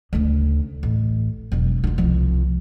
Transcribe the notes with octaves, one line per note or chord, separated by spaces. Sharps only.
D2 C#3
A1
E1 F#3
E4 F4
C2 F3